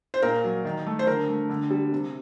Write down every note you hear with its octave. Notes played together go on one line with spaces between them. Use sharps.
C5
A#2 A#4
F#3
D#3
A3
C5
D3 A#4
A3
D3
G3
C3